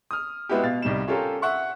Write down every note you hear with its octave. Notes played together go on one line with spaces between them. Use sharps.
D#6 F6
G#3 B3 E4 F#4 G4
B2 F5 A6
C2 G3 D#4 E7
C#4 F4 G4 A4 A#4
E5 F#5 C#6